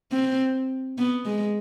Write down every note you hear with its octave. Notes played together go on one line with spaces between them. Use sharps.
C4
B3
G#3